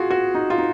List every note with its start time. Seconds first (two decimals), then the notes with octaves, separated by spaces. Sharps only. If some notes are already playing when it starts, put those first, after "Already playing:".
Already playing: F4 F#4 G#4
0.11 F#4
0.35 D#4
0.50 F4
0.58 D#4